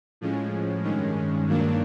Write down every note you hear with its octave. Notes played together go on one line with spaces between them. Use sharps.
A2 F3 G#3 C#4
G2 D#3 G#3 C#4
G2 D#3 F#3 A#3 D4